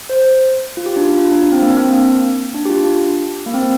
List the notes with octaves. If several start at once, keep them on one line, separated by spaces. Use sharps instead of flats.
C5
F4
G4
D4
F4
F4
D4
D4
C4
A#3
D4
C4
A#3
D4
G4
F4
D4
A#3
C4
A#3